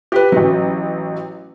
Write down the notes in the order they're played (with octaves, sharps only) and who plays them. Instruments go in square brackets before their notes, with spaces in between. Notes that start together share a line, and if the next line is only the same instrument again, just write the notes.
[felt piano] G4 B4
A1 F#3